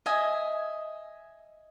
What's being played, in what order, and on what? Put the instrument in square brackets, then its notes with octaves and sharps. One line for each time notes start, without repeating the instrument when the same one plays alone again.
[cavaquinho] D#5 E5 G#5